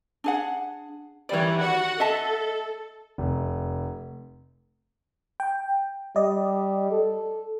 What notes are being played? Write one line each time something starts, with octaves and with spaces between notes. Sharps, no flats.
D4 G#4 F#5
D#3 E3 G3 C#5 D5
F#4 F#5
A4 D#5 E5 A5
F1
G5
G3 D5 D#5
A4